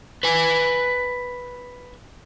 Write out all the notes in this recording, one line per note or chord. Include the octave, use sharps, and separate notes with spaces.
B4 G#5